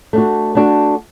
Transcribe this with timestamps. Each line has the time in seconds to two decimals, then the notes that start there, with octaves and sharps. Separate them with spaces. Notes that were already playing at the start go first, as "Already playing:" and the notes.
0.13 A3 D4 F#4
0.55 A3 D4 F#4